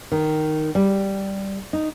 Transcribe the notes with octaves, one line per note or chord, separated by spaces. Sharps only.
D#3
G3
D#4